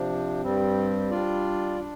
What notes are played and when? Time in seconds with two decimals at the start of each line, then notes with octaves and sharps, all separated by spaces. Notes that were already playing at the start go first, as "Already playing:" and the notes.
Already playing: C3 F3 D4
0.41 G2 G3 C4
1.11 G3 D4 F4 D5
1.80 D4